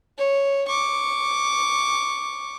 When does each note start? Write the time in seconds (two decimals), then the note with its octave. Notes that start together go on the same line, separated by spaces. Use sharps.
0.18 C#5
0.68 C#6 D6